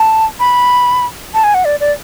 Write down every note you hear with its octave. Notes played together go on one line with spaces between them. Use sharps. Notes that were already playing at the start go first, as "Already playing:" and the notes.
Already playing: A5
B5
A5
G#5
F#5
D5
D5